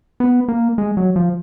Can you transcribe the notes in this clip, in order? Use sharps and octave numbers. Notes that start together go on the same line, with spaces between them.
B3
A#3
G#3
F#3
F3